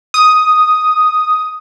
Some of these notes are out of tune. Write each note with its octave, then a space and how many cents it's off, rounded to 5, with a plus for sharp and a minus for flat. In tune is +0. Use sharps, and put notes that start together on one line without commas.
D#6 +0